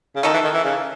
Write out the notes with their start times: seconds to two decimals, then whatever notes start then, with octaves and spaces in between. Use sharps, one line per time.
0.16 C#3
0.23 D#3 A3 D#4 A4
0.34 E3
0.44 D#3
0.54 E3
0.64 C#3